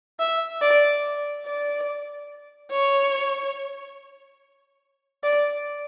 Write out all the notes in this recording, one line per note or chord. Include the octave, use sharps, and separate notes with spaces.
E5
D5
D5
C#5
D5